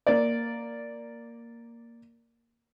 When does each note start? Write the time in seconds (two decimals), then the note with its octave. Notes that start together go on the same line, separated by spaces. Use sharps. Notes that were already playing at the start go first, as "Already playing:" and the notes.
0.07 A#3 D5